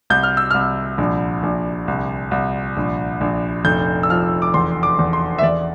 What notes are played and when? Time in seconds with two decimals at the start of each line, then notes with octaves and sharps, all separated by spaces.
0.10 C2 G6
0.23 F6
0.37 E6
0.51 C2 F6
0.98 A#1
1.43 A#1
1.88 C2
2.31 C2
2.77 A#1
3.21 A#1
3.65 F1 G6
4.03 E6
4.09 F3 F6
4.42 D6
4.54 E2 C6
4.83 D6
4.99 E2
5.13 C6
5.38 E5
5.42 E2 D5